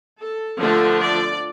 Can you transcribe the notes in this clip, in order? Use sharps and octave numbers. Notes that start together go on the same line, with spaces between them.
A4
D3 F3 A3 D4 A4
D5